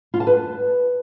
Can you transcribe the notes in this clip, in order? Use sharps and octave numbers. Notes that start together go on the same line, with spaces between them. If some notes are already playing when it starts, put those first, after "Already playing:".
F4
A5
B4